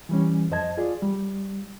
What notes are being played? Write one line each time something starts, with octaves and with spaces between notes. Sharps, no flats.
E3 G3 C#4
F2 C5 D#5 A5 G#6
F4 G#4 D5
G3